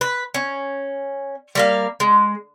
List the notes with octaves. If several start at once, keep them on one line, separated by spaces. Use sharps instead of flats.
B4
C#4
G3 A#3 F5
G#3